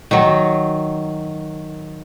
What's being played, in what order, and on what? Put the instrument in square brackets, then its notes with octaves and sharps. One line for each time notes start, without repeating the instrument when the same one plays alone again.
[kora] D#3 F#3